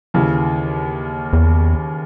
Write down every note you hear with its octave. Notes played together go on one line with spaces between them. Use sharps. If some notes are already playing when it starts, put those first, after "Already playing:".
D#2 C#3 E3
E2